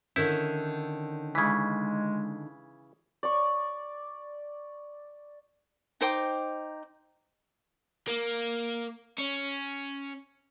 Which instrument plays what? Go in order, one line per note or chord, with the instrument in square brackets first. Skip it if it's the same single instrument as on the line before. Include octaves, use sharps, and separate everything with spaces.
[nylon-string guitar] D3 D#3 C#4 [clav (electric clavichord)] E4 [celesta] A#4 G6
[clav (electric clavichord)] C#3 E3 [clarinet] G#3 [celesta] G#6 B6
[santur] D5 C#6
[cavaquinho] D#4 C5 G5 D6
[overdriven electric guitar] A#3
C#4